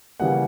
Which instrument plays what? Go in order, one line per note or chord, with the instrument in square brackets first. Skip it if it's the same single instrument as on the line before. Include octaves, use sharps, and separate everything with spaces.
[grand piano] C#3 E3 G3 A#3 F#5